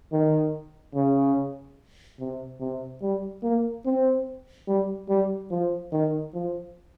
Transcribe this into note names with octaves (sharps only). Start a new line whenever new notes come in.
D#3
C#3
C3
C3
G3
A#3
C4
G3
G3
F3
D#3
F3